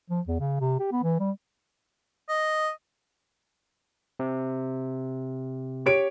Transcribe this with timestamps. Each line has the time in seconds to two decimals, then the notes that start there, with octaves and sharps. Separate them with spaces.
0.10 F3
0.27 E2
0.40 C#3
0.60 C3
0.79 G4
0.92 B3
1.03 E3
1.20 G3
2.29 D#5
4.19 C3
5.86 G4 C#5 D7